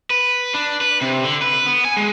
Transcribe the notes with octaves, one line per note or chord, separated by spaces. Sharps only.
B4
D4
B4
C3
D3
B4
B3
G#5
G#3